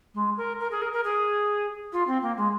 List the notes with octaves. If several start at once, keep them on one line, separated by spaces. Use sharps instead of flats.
G#3
A#4
A#4
G#4
A#4
A#4
G#4
F4
C4
A#3
G#3